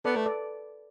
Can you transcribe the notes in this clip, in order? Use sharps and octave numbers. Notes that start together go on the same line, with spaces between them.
B3 A4 D5
A3 B4
A4 D5